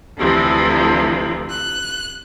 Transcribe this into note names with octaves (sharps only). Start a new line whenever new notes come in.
D2 C3 E3 F3
F#6